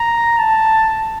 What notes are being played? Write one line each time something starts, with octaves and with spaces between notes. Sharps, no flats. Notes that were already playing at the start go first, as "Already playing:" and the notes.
Already playing: A#5
A5